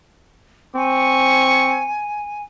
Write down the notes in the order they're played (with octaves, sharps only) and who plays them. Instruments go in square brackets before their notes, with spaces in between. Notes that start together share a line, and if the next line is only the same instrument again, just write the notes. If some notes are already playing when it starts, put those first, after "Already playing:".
[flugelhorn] C4 [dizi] G#5 [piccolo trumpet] C#6